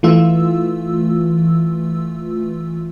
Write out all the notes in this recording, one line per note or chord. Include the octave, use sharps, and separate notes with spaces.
E3 A3 F4 E6